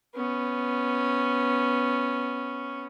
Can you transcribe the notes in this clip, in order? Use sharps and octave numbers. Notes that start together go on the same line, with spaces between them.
B3 C#4